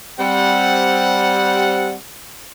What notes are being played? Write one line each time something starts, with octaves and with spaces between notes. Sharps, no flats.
G3 C4 F#5